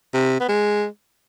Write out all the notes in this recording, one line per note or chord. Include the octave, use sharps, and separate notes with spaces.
C3
B3
G#3